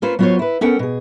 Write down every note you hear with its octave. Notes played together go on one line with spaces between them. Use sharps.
A#3 C#4 F4 B4 C5
F#3 B3 F4 F#4 C5 C#5
E4 B4
B3 C#4 A4 A#4 F#5 G5
B2 G#4